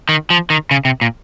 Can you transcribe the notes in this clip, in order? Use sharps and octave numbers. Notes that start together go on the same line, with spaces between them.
D#3
F3
D#3
C#3
C3
A#2